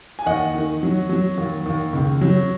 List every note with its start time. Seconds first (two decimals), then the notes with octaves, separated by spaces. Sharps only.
0.19 G#5
0.26 D#2 D#5 F#5
0.55 D#3
0.83 F#3
1.09 F#3
1.38 D#2
1.66 D#2
1.93 C#2
2.21 F#3